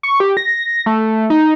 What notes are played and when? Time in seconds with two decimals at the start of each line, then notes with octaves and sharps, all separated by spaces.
0.03 C#6
0.20 G4
0.37 A#6
0.86 A3
1.30 D#4